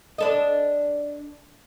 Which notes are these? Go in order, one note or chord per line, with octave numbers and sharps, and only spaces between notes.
D4 A4 D#5